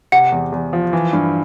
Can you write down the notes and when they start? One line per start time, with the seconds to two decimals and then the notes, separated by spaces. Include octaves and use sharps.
0.12 C3 F#5
0.32 E2
0.52 E2
0.73 F3
0.93 E3
1.13 G2